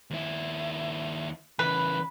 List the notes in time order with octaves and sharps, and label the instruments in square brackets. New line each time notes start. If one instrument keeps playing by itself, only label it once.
[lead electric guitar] D#2 E4
[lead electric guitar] C#3 E3 [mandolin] B4